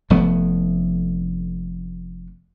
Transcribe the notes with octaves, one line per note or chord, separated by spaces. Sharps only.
F1 F3 A3 B3